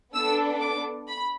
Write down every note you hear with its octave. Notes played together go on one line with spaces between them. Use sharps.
B3 D4 A4 E6
D6
B5